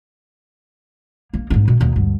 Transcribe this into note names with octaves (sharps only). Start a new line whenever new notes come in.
A#3
G#2 D#4
B2
D#2 B2
D2 G2